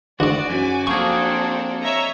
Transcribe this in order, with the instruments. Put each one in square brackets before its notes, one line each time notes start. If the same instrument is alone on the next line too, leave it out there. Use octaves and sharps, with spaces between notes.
[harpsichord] D2 G#2 [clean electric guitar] F#4 [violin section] D5
[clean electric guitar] F#2 [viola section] F#4 [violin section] G#5 D6
[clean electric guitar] F3 A#3 G#4 [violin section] C4 D4 A4 [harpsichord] C#6
[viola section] C#5 E5 A#5 [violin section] D#5